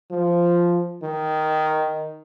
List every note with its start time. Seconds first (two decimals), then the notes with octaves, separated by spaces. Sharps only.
0.11 F3
1.03 D#3